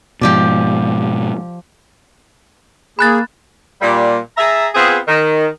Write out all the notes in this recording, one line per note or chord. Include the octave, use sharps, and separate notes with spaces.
G#2 B2 F3 G4 D5
A#3 G#4 B5 F#6 A6
A#2 G3
G#4 E5 A5 A#5
B3 C4 F4 G#4
D#3